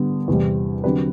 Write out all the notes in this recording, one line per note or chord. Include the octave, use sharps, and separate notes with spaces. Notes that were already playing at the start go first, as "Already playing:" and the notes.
Already playing: D3 G3 B3 D4
E2 C3 G3
D3 F#3 C4 G4 B4